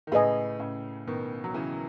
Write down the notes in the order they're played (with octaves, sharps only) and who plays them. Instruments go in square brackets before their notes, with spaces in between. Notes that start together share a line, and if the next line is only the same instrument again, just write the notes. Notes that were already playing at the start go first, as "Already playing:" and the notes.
[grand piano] D#3
[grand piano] A2 C#3 [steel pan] G#4 B4 D#5 G#5
[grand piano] A2 C#3
B2 D#3
F#3
C#3 E3